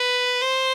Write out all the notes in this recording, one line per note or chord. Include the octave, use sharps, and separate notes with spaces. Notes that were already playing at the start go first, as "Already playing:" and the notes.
Already playing: B4
C5